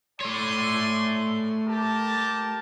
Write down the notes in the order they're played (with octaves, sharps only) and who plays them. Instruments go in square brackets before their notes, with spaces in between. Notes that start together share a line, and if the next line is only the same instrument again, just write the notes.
[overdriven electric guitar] A3 C#5 [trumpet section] D5 G#5 C6
[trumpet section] G4 A#4 A5